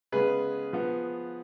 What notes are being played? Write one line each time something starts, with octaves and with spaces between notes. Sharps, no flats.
C#3 G#3 B3 G#4 B4
F3 B3